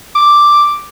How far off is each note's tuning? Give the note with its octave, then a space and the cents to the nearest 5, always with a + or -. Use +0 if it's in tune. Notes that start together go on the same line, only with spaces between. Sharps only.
D6 +0